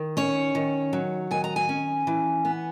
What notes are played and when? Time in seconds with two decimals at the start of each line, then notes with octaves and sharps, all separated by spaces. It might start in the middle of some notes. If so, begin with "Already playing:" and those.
Already playing: D#3
0.17 C#4 C#5
0.55 D#3
0.93 F#3
1.31 D#3 G#5
1.44 A#5
1.56 G#5
1.69 C#4
2.07 E3
2.45 B3